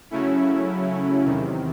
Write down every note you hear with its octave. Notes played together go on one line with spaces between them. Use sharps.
C#3 F#3 A3 C#4 E4
E2 C3 D#3